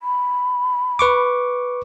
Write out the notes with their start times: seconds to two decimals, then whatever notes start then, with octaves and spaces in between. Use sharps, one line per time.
0.01 B5
0.99 B4 C#6 D6